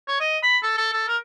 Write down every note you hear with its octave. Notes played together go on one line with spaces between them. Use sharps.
C#5
D#5
B5
A4
A4
A4
A#4